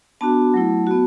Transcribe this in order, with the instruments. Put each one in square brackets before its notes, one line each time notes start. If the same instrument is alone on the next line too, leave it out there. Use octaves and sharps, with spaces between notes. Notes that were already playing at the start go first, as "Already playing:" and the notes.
[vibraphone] B3 D4 F#4 A5
F#3 A3 E4
B3 F#4